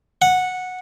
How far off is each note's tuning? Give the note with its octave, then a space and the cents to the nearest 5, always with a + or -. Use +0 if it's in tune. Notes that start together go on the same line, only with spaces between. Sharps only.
F#5 -10